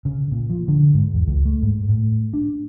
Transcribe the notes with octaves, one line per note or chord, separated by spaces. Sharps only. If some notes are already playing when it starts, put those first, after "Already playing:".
C#3
A#2
F3
D3
G#2
E2
C#2
A3
G#2
A2
D4